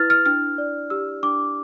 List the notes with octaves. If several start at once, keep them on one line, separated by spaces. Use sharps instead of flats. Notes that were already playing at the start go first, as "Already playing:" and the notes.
Already playing: E4 B4 F6 A6
F6
D4 F6
D5
G4 E6
D4 D6